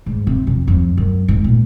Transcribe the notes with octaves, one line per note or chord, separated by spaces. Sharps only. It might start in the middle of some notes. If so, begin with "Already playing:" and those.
G#2
C3
F2
F2
F#2
G#2
A#2